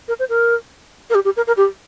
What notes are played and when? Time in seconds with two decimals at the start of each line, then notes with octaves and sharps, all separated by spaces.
0.08 A#4
0.19 C5
0.29 A#4
1.10 A#4
1.15 G4
1.25 G4
1.36 A#4
1.47 A#4
1.57 G4